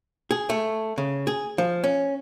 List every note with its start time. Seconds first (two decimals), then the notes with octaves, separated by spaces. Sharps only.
0.31 G#4
0.50 A3
0.98 C#3
1.27 G#4
1.58 F3
1.84 C#4